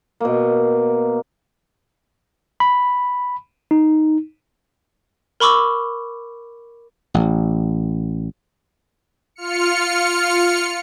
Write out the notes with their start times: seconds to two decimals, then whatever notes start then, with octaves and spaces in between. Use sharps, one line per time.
0.20 B2 A#3
2.60 B5
3.71 D#4
5.40 A#4 B5 C#6 D6 E6
7.14 A1
9.36 F4 F6 C#7